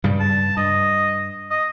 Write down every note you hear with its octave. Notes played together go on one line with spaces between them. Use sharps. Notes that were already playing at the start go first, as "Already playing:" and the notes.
G2 C#3 G3
A5
G2 D#5
D#5